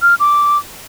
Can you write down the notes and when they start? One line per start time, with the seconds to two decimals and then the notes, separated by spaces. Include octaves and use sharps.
0.02 F6
0.20 D6